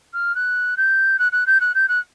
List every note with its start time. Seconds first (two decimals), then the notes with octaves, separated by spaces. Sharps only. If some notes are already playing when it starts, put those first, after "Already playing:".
0.14 F6
0.35 F#6
0.77 G6
1.19 F#6
1.32 F#6
1.47 G6
1.61 F#6
1.75 G6
1.89 F#6